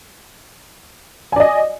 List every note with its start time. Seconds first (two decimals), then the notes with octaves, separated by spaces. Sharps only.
1.32 G#5
1.36 D5
1.40 D#5